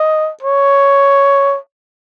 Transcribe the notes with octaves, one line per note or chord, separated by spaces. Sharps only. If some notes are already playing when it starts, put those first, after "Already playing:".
Already playing: D#5
C#5